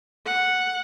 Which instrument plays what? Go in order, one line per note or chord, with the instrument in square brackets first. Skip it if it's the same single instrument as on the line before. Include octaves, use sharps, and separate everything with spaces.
[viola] F#5